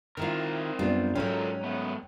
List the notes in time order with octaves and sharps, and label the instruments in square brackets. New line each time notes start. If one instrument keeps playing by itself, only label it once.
[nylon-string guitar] D#3 E4 F4 [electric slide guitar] C4 A#4
[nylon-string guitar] F#2 D4 F4 [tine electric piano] G3 B3
[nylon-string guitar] G#2 F#3 [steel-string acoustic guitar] C#4 [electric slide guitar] F4 A4 A#4 [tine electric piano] G5
[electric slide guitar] A3 B3